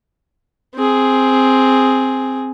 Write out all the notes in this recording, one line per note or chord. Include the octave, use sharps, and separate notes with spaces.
C4 G#4